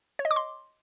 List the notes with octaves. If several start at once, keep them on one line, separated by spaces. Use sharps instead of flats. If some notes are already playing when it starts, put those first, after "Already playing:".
C#5
D#5
D6
C6